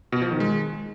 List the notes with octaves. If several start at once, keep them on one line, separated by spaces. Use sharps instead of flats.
B2
F3
D#3
G#3